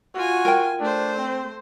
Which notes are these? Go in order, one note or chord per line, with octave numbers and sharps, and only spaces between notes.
F4 F#4 G#5
A#4 G5
A3 D4 C5
C4